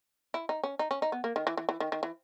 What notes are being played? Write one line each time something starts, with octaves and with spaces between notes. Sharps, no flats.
E4
D#4
C#4
D#4
C#4
D#4
B3
A#3
D#3
E3
E3
E3
D#3
D#3
E3